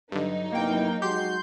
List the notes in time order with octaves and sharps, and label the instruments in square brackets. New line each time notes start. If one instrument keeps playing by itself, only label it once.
[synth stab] G2 D3 [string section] F#3 D#4
[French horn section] C3 B3 E4 [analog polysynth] A#3 G5
[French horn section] G#3 F#4 [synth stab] G4 [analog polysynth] C6 G6